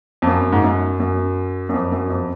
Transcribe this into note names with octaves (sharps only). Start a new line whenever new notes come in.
F2
F#2
G#2
F#2
F#2
F#2
F2
F#2
F2